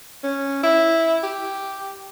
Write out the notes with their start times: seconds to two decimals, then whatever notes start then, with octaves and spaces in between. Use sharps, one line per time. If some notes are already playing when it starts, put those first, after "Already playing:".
0.24 C#4
0.63 E4
1.23 G4